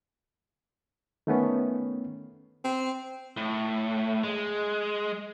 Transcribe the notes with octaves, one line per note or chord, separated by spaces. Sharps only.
D#3 A3 B3 C#4
C4
A2
G#3